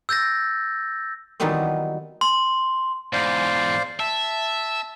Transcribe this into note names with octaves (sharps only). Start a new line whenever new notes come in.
E6 G6 A6 A#6
D#3 E3 F#3 G3 B3 C4
C6
E2 G#2 C5 D5 F5
E5 A5